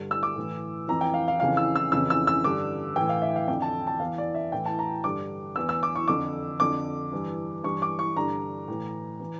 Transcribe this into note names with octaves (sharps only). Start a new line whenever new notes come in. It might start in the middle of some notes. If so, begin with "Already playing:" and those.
Already playing: G2 D3
E6
D6
A2 E3
F2 E3 A#5
G5
F5
F5
F2 C#3 E3 F5
E6
E6
F2 C#3 E3 E6
E6
E6
G2 D3 D6
A2 E3 G5
F5
E5
F5
F2 D3 G5
A5
A5
E2 E3 F5
D5
E5
A2 E3 G5
A5
A#5
G2 D3 D6
E2 E3 E6
E6
D6
C#6
F2 D3 D6
F2 D3 D6
G2 E3
G2 E3 C#6
D6
C#6
G2 D3 A#5
A2 E3
E3